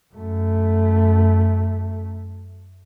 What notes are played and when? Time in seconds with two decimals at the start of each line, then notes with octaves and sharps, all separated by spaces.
0.14 F#2 A3